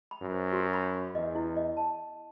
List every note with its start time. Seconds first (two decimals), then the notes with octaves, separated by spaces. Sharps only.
0.11 B5
0.21 F#2
0.32 C5
0.53 F#4
0.74 B5
0.94 B5
1.14 E2 D#5
1.35 E4
1.57 D#5
1.77 A5